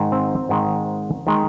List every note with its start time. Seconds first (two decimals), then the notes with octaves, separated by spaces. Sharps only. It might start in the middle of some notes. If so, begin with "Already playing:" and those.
Already playing: G#2 D#3 G#3
0.12 C4
0.49 G#2 D#3 G#3
1.27 D#3 G#3